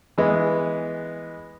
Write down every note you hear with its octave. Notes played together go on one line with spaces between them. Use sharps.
E3 G#3 B3